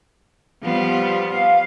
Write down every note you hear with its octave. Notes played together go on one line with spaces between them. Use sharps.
F3 G3 B3
F5